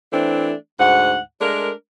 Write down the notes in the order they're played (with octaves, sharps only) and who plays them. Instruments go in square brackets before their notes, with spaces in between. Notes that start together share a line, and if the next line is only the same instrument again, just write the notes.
[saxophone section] E3 A3 C4 D4
D2 G#2 F#5
G#3 A3 D4 A#4